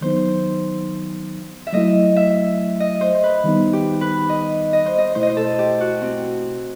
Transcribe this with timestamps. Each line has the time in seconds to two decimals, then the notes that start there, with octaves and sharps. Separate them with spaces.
0.01 D#3 F#3 B3 D#4 C5
1.67 E5
1.72 F#3 A3 E4 D#5
2.16 E5
2.80 D#5
3.01 C5
3.23 B4
3.44 D#3 G3 B3 D#4
3.73 G4
4.01 B4
4.29 D#5
4.73 D#5
4.86 C5
4.98 D#5
5.15 B2 A3 E4 C5
5.23 D#5
5.30 C5
5.37 A4
5.59 G4
5.80 F#4
6.02 C4